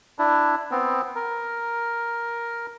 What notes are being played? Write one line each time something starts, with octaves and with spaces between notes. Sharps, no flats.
D4 E4
B3 C4
A#4